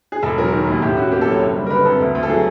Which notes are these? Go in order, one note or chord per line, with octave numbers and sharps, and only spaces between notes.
G#4
E1 A4
F#3 A#4
D#3
D#2
A2 G4
C#4 F#4
A#3 G4
A4
F#3
C#5
F#1
G3
A#4
D3 B4
F2 A4
D2
D2
A4
F#3 G#4